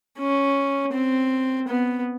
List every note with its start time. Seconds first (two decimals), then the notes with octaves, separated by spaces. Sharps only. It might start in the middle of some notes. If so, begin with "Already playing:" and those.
0.18 C#4
0.93 C4
1.68 B3